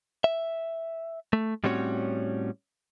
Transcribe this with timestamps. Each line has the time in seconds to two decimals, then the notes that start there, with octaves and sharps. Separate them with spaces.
0.24 E5
1.33 A3
1.64 A2 G3 C4 C#4 F#4 C#5